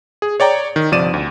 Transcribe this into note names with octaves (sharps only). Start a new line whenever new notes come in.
G#4
C#5 D5 G5 A#5
D#3
G1 C3 F3 D5 D#7 E7
D2